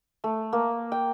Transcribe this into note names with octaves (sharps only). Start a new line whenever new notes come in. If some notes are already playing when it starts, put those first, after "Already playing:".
A3
A#3
G5